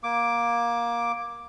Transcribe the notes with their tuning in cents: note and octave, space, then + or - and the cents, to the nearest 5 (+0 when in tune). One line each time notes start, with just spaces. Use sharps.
A#3 +15 D6 +0